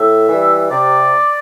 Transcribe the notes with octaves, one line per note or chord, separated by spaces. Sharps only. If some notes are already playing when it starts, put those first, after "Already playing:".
Already playing: A2 E5
E3 G3
C3 D5